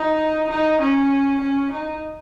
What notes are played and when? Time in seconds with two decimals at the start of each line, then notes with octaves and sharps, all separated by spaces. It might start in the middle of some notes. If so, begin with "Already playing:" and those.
Already playing: D#4
0.49 D#4
0.80 C#4
1.41 C#4
1.71 D#4